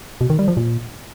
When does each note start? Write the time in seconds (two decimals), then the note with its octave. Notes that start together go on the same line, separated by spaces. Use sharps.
0.21 B2
0.30 D#3
0.39 G3
0.48 F3
0.57 A#2